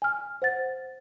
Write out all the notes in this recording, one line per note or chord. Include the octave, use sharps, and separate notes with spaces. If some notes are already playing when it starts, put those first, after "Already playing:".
G#5 F6
C5 F#5 A6